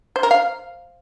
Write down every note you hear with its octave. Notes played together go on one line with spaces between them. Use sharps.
C5
A#4
F5